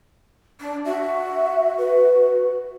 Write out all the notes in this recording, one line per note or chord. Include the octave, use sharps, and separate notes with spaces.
D4
F#4 E5
B4